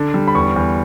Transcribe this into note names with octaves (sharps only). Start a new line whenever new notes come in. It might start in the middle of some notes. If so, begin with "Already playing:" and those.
Already playing: D3 D4
G3
B5
E2 C#6
E2